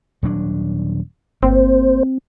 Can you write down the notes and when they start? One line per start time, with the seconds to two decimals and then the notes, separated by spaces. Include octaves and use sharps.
0.23 D#1 F#3 D4
1.43 G1 A#3 C4 C5